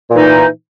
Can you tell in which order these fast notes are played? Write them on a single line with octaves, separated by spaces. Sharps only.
A#2 E3 D#4